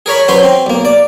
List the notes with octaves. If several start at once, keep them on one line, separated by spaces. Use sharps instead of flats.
G#4 A#4 C#5 B5
F#3 C#4 B4 C5 C6
C4
B1 A#3
D5